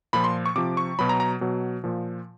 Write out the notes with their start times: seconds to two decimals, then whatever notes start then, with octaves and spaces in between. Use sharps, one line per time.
0.13 A#2 F3 B5
0.24 C6
0.46 C#6
0.56 C3 F3 D6
0.77 C#6
0.99 B2 F#3 B5
1.09 A#5
1.20 A#5
1.41 B2 F#3
1.84 A#2 F3